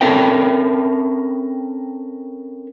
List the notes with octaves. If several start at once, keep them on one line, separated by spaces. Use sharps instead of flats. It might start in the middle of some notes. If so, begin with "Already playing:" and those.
C4 C#4 A4 A#4 E5 G5